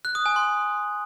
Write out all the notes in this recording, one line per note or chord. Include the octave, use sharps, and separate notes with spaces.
F#6
D#6
G#5
C6